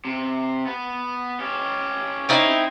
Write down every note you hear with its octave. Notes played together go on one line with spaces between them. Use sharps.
C3
B3
C#4 G4
C4 D#4 E4